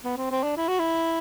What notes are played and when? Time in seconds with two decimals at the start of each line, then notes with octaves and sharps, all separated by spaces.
0.04 B3
0.17 C4
0.31 C4
0.43 D4
0.57 E4
0.68 F#4
0.79 E4